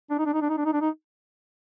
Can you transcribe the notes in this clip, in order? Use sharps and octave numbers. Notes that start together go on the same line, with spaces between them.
D4
D#4
D4
D#4
D4
D#4
D4
D#4
D4
D#4